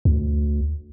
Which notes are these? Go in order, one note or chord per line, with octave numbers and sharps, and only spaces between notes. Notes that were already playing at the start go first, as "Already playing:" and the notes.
D2